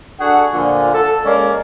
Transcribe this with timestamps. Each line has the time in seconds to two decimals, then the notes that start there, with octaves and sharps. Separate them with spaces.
0.20 D4 F#4 G#4 A4 F#5
0.53 A#2 D3 F3 F4 G#5
0.93 A4
1.24 G#3 A#3 C#4 D5